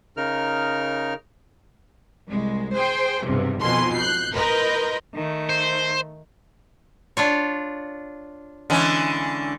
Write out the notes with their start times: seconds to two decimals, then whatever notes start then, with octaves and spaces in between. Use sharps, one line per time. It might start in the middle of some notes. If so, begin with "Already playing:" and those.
0.17 C#3 D#4 A#4 F6
2.27 C2 G#3
2.74 G#4 C5 G5
3.25 B1 E2 G2 C3
3.60 F2 B2 D#3 G#5 C6
3.94 F#6 G6 C7
4.36 A#4 B4 D#5 C6 G6
5.14 D#3 A3
5.49 C5
7.17 D4 F4 C#5
8.70 D3 E3 G#3 C#4